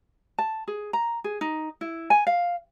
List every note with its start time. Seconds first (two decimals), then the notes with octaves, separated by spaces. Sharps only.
0.39 A5
0.68 G#4
0.93 A#5
1.24 G#4
1.41 D#4
1.81 E4
2.10 G#5
2.27 F5